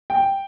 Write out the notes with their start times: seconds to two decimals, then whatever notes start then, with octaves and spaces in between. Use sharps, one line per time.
0.10 G5